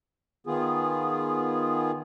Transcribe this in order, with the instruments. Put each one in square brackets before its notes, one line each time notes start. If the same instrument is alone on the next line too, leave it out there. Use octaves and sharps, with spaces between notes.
[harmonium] D#3 B3 F4 G#4